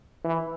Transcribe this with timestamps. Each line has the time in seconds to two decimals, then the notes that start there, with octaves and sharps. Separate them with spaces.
0.24 E3